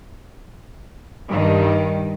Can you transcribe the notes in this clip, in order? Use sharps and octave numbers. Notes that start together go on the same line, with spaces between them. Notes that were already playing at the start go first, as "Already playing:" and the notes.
G2 D#3